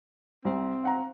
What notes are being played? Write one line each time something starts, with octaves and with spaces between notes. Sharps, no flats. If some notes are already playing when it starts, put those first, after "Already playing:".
C2 C4
F5 F#5 A#5